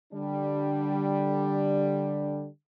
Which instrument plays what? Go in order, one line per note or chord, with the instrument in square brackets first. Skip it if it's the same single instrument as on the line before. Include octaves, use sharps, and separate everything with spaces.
[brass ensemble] D3 G3 D4